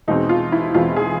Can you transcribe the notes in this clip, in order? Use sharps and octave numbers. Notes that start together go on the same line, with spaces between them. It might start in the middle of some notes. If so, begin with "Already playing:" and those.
E2 B2 G#3 C4 D#4
F4
E4
E2 B2 G#3 C4 F4
G#4